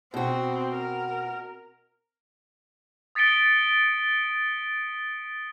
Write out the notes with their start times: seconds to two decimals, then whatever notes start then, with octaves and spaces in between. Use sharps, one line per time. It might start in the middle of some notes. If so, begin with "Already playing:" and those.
0.14 B2 C4 F#4
0.75 A#4
3.15 D#6 A6 B6 C#7 D7 G7